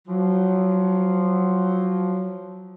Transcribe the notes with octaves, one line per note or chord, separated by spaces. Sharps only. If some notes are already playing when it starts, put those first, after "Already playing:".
F3 F#3